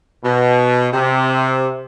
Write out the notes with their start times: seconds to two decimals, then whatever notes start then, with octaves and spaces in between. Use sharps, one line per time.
0.24 B2
0.93 C3